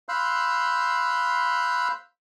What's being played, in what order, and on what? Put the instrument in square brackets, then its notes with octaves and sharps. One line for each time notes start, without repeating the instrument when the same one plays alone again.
[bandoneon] F5 B5 C6 E6 F#6 G6